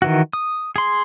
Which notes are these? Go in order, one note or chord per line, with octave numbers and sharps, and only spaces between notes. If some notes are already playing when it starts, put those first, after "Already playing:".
D#3 E3 F#4
D#6
G#4 C6